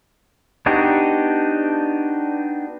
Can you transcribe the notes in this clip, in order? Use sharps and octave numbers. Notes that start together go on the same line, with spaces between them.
B3 D4 D#4 F#4 G4